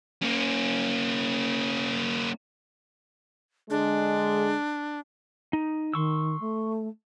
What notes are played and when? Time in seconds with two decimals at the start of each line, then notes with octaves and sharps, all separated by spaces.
0.22 A#3 C#4
3.70 D3 G#3 D4
5.53 D#4
5.94 D#3 C6 C#6 E6
6.40 A3